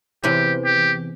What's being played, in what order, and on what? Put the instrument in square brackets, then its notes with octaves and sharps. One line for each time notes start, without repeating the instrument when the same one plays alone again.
[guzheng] E2 C3 E3 [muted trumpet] G4
[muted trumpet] G4